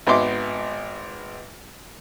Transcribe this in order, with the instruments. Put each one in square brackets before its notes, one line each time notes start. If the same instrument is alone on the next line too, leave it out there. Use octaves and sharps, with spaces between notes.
[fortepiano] G#1 B3 D#4 E5 C6 D6